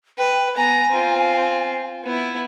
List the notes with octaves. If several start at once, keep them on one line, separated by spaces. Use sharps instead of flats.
B4 G5
B3 G#5 A#5
C4 F4
B3 E4